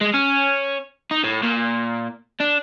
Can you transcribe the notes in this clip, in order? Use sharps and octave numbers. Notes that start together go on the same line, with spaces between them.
G#3
C#4
D#4
A2
A#2
D4